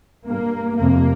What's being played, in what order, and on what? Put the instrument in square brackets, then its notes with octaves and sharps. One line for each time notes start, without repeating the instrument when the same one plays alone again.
[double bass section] G2 A#3
F2 C3 A#3